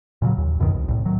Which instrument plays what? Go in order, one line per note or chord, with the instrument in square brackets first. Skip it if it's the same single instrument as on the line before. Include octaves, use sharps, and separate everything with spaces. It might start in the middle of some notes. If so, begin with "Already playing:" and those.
[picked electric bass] A#2 C#3 E3 F#3
D#2
C#2 F#2 B2 D#3
C2
C2 A2
A2 D#3 F#3